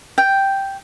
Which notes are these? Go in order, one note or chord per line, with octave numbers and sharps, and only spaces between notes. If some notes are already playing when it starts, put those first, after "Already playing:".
G5